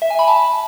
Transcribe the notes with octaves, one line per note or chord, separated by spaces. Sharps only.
E5
G#5
B5
A5